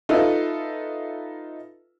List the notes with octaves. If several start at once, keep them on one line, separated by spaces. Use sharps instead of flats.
D#4 F4 A4 B4 E5